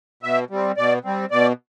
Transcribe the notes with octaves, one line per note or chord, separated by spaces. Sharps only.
B2 E5
G3 C4
B2 D5
G3 C4
B2 D5